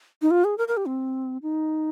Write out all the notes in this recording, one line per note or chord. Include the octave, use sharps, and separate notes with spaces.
D#4
F4
G#4
A#4
A#4
G4
C4
D#4